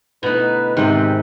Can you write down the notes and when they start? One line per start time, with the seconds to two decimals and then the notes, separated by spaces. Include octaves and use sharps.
0.23 D2 B2 D#4 E4 B4 A#5
0.77 G#2 C3 D#3 G#3 B4